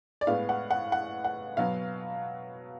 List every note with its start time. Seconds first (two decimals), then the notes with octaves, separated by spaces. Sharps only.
0.21 D5
0.27 A2 G#3 B3 F5
0.49 F#5
0.71 F#5
0.92 F#5
1.24 F#5
1.57 B2 F#3 B3 F5